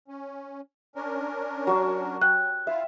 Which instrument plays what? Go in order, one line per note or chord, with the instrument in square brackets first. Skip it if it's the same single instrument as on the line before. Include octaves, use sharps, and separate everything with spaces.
[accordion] C#4
C#4 D4 A#4
[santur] F#3 F#4
[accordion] F#3 [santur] G5 [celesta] F#6
[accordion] E4 F4 F5 [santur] E5